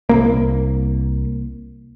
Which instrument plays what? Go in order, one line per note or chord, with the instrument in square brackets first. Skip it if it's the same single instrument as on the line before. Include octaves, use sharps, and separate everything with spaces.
[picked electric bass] C2 A#3